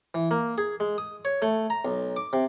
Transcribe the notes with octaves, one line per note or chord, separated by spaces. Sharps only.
E3
A#3
G#4
G#3
D#6
C#5
A3
A#5
B1
D6
C3